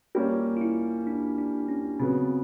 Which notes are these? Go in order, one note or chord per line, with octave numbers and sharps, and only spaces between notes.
G3 A#3 C#4 F4
F4
E4
D4
D4
C#4
C#3 F#3 B3 C4